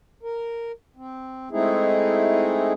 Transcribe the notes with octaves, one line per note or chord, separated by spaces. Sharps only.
A#4
C4
G#3 A3 C4 D#4 E4 G#4